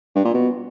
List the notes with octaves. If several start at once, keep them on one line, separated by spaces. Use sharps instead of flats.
G2
A#2
B2